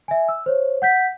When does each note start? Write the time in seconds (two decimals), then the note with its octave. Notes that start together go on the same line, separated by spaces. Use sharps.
0.08 E5 G#5
0.29 E6
0.46 C5 C#5
0.82 F#5 G6 B6